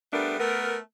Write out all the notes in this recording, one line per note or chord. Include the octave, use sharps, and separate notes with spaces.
G3 A3 B3 D4 A#4
A3 B3 A#4